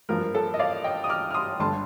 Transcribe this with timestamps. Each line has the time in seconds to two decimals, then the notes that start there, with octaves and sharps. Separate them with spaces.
0.09 G2 F3 A#3 A#4
0.34 A4
0.54 D#5
0.59 D5 F5
0.84 D#5 G5
1.04 D#6
1.09 D6 F6
1.31 F6
1.34 C6 D#6
1.60 G1 G2 D3 A5 C6